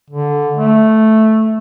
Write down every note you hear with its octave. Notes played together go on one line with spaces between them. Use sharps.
D3
A3